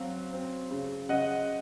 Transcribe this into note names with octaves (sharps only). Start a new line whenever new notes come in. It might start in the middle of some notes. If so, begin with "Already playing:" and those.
Already playing: F#3 C4 F5
C4
C#3
C#3 D#5 F#5